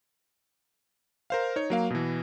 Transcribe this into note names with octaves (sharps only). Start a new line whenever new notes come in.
A#4 C5 F5
D#4 C#5
F#3 A#3 F5
B2 E3